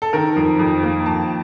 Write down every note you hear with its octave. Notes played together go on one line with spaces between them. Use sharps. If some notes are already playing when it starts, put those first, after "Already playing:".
A4
D#3 A#4
F2
F2
A#3
F2 A5